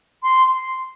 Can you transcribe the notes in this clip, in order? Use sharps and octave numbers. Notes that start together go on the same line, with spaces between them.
C6